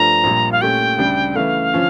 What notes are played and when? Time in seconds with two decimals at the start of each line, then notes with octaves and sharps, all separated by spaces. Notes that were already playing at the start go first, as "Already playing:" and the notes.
Already playing: G2 F3 A3 D4 A#5
0.24 A#1 A#2 G3
0.52 F5
0.61 A#2 A3 C#4 G4 G5
0.98 D2 C#3 G3 D4
1.35 C#3 E3 A3 F5
1.74 D3 F3 C#4